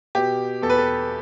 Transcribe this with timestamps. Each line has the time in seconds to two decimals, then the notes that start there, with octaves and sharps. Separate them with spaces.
0.15 B2 G4
0.62 E2 A4
0.70 B4
0.78 A4